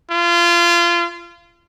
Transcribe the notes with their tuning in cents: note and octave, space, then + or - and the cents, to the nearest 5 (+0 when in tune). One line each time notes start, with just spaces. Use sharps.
F4 -25